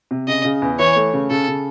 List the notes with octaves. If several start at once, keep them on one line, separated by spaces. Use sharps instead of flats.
C3
C#3 D#5
C#3
E2
E3 C#5
A3
C#3
C#3 A4
C#3